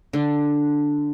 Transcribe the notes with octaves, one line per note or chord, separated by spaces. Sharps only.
D3 D4